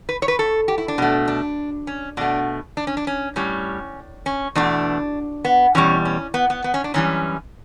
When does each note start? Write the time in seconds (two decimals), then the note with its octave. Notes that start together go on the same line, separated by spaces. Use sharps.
0.09 B4
0.22 C#5
0.28 B4
0.39 A4
0.68 G4
0.78 E4
0.88 D4
0.98 B2 A3
1.28 D4
1.87 C#4
2.17 B2 A3 D4
2.77 D4
2.87 C#4
2.97 D4
3.07 C#4
3.36 A2 G3 C#4
4.26 C#4
4.55 E2 B2 A3 D4
5.45 B3
5.75 E2 B2 G3 C#4
6.05 C#4
6.34 B3
6.50 B3
6.64 B3
6.74 C#4
6.84 D4
6.94 F#2 E3 G3 C#4